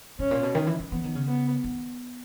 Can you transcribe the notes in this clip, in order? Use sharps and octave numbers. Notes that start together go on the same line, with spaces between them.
G#2 C#4
A#2
B2
D#3
E3
D#3
E3 B3
D#3
C#3
B3
D#3